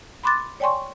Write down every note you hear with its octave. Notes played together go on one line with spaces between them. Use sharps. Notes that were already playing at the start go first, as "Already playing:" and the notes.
B5 C6 D6 F#6 A6
C#5 D5 G5 G#5 C6 C#6